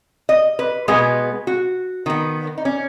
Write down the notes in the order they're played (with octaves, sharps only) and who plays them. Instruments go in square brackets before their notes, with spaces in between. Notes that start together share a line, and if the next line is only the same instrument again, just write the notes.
[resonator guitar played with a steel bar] D#5
B4
B2 G#3 B3 G#4
F#4
D#3 B3
D#4
C#4